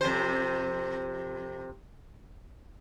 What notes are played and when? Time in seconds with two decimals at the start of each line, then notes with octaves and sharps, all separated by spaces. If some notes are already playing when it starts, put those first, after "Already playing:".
0.01 F2 C3 C5